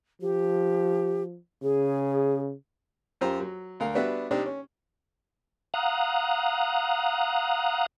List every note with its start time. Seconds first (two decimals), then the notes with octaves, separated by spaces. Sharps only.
0.22 F3 G4
1.63 C#3 G#4
3.21 F#2 F4 G4 C5 A#5
3.40 F#3
3.80 D2 A#4 F5
3.95 G3 B3 D4 F#4 B4 E5
4.31 C3 D4 D#4 G4 C5
4.46 C#4
5.74 F5 F#5 A#5 D#6 F#6